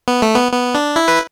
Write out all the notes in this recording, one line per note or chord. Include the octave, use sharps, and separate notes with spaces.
B3
A3
B3
B3
D4
E4
B4